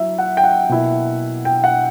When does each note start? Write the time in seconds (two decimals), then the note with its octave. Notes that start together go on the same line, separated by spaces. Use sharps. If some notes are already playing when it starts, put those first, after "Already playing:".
Already playing: F#3 E4 E5
0.19 F#5
0.37 G5
0.44 F#5
0.69 B2 A#3 E4
1.45 G5
1.64 F#5